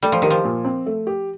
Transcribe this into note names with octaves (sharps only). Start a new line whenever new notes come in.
G3 A3
F3
D#3 G4
F3
A#2
C4
A3
G4